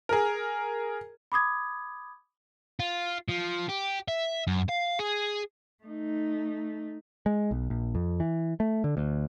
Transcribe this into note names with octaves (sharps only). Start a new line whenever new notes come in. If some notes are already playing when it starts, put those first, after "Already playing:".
G#4 A#4
B5 D6 D#6 G#6
F4
F3
G4
E5
F#2
F5
G#4
A3 D#4
G#3
B1
A#1
F2
E3
A3
D3
D2